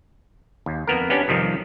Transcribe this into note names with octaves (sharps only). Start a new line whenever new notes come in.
D#2
F2 A#3 B3 A#4
B3 C#4 D4 G4
F2 C3 D#3 F3 G3